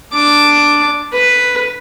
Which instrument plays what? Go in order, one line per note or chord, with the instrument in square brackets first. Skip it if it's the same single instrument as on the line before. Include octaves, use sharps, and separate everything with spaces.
[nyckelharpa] D4 D6
B4